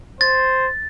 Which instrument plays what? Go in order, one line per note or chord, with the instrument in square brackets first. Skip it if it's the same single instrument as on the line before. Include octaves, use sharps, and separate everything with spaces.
[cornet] C5 [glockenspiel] A6